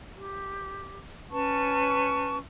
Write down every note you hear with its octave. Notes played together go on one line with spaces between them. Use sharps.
G4
C#4 B4 A5 C#6